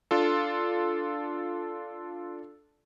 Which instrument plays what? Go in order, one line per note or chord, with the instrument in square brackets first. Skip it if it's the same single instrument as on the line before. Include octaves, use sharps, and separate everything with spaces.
[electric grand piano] D4 F4 A4